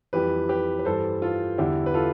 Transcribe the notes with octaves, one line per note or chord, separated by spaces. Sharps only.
F2 E3 G3 G4 B4
G4 B4
B4
G2 E3 G3 A4 C5
F4 A4
E2 D3 G3 E4 G4
B4
F4 A4